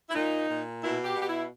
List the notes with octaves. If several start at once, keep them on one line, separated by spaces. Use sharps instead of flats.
E4
A#2 D#4
A#2
B2 E4
G4
B2
G4
E4